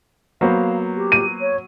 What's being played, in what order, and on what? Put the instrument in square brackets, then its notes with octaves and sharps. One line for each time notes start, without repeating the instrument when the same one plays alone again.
[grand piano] F#3 [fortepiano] A#3 B3 C5 [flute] F5
[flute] G4
[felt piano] D#7
[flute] C#5